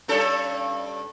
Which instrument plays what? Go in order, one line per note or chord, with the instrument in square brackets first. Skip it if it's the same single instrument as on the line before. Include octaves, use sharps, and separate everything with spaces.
[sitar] G2 C#4 A4